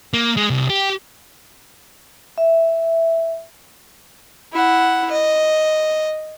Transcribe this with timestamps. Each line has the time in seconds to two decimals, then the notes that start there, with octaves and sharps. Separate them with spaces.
0.14 A#3
0.37 G#3
0.50 C2
0.70 G4
2.38 E5
4.53 E4 F#5
5.11 D#5